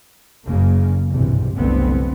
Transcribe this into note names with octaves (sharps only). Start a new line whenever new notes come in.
F#1 C#3 A#3
B1 E2 G2 C3
F#1 C2 A2 D3 B3 C4